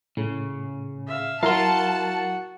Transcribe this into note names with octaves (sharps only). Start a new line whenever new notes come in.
A2 C#3
E5 F5
F#3 E4 F#4 A#4 F5 F#5 A5 C6